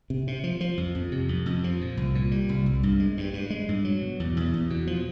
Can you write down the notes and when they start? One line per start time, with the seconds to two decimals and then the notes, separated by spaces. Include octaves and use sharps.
0.10 C3
0.27 C3
0.44 F3
0.61 F3
0.78 F2
0.95 F2
1.12 C3
1.29 F2
1.46 F2
1.64 F3
1.81 A#2
1.97 C2
2.15 A#2
2.31 G3
2.49 C2
2.66 C2
2.83 G2
3.00 G#3
3.17 G2
3.33 G2
3.50 G#3
3.69 G2
3.85 F#3
4.02 B2
4.20 E2
4.37 E2
4.54 E2
4.70 B2
4.87 F3